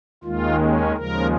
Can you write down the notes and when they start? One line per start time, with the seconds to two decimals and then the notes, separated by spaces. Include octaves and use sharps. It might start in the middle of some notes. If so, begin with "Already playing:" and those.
0.24 D#2 D#3 G#3 F4
0.60 C#4
0.95 D#2 C#3 F3 G#3 A#4